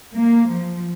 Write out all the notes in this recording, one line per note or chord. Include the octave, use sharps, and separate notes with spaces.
A#3
F3